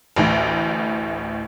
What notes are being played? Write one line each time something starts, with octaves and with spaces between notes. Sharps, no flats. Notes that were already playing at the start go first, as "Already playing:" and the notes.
A1 D2 A2